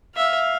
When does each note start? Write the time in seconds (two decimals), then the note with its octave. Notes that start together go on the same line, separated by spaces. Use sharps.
0.16 E5 F5